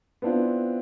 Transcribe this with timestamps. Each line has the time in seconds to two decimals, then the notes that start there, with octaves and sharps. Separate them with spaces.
0.22 B3 C4 D4 E4 F4